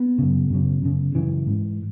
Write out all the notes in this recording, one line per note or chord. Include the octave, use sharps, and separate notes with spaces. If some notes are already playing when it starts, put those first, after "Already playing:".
Already playing: B3
F#2 C#3
F#2 C#3
F#2 C#3
F#2 C#3 E3
G#2